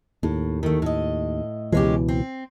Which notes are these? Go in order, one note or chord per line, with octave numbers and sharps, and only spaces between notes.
D#2 A2
D#3 A3
A2 D#5
C#2 B2 E3 G#3 C#4 G4
C4